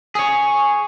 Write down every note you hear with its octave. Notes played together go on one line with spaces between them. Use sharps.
G#4 C#5